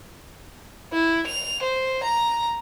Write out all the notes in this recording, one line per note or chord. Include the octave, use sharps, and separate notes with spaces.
E4
F7
C5
A#5